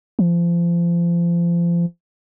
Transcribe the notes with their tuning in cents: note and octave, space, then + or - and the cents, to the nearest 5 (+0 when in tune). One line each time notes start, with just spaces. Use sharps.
F3 -30